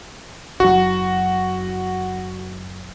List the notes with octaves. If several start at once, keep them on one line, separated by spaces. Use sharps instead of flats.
F#1 F#3 F#4